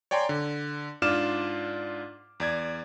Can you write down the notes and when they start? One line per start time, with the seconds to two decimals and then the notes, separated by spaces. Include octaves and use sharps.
0.11 C#5 D5 G5 G#5 A#5 C6
0.29 D3
1.02 G#2 D4 F4 D6 F6 E7
2.40 E2 D5 G#6